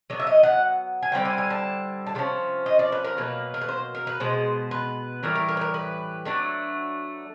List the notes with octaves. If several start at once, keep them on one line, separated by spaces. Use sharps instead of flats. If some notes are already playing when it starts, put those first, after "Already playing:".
F#3 B3 D4
E5
D#5
F#5
G#5
D3 G3 C4 E4 G5
G#5
G#5
A5
A5
C3 F3 C#4
D#5
D5
B4
A#4
B2 F#3 A#3 B4
A#4
B4
C5
A#4
B4
B2 G#3 B3 C5
B4
A2 E3 G3 A#4
A#4
A#4
B4
A#4
B4
F#3 A3 D4